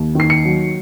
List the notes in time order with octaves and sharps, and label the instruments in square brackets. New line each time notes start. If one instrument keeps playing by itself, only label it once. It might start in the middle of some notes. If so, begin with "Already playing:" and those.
Already playing: [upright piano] D#2
D#3 C7
C#7
F#3